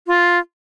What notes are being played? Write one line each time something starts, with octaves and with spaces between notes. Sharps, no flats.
F4